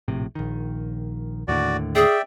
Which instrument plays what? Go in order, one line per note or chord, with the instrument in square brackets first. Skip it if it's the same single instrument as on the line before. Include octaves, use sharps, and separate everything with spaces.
[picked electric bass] A#1 A2 C3
A#1 D#3
[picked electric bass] D#2 A2 D3 [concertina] F#4 D5
[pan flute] G#4 [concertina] D5 E5 G5